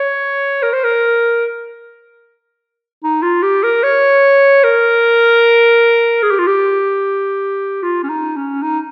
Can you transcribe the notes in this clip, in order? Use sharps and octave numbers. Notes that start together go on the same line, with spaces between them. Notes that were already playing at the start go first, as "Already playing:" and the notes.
Already playing: C#5
A#4
C5
A#4
D#4
F4
G4
A#4
C#5
A#4
G#4
G4
F4
G4
F4
C#4
D#4
C#4
D#4